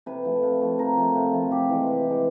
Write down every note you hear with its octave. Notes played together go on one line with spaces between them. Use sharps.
C3 B4
F3 A3
C3
F3 A3
C3 A#4
F3 A3
C3
F3 A3
C3 G4
E3 G#3
C3
E3 G#3